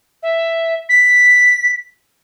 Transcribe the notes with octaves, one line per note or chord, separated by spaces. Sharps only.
E5
B6